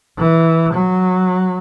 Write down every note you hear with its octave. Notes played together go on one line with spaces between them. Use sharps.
E3
F#3